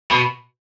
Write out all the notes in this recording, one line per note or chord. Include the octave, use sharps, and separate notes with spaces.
B2